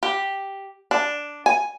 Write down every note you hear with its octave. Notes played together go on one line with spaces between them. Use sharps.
G4
D4
G#5